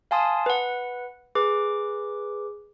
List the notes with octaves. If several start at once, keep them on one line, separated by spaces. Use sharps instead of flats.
F5 G#5 A5 C6 D#6
B4 F#5
G#4 B4 D6